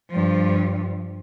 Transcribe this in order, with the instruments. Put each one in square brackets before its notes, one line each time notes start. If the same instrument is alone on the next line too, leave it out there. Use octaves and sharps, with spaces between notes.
[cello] G2 F3